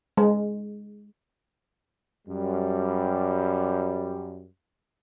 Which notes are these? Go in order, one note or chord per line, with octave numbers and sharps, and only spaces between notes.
G#3
F#2 G3